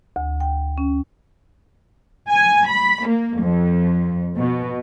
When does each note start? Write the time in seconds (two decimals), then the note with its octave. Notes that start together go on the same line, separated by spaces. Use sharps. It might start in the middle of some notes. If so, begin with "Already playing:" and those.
0.16 D2
0.40 G5
0.78 C#4
2.30 G#5
2.68 B5
3.06 A#3
3.39 F2
4.37 B2